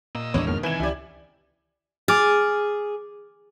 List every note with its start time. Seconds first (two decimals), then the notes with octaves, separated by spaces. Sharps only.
0.15 A#2 A#3 D#5 E6
0.34 G#1 E2 G#3 B3 D4 C#5
0.47 F2 B2 D#3 F6
0.63 C2 D#3 E3 B4 G#5 G#6 E7
0.80 C#2 E4 G4 D5
2.08 G#4 D6 F6 A6